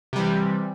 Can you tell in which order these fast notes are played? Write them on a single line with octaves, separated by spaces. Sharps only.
C3 G3 E3